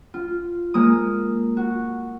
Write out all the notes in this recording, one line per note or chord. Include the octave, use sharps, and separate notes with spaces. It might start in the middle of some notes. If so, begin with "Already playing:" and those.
F4
G#3 A#3 D#6
F#4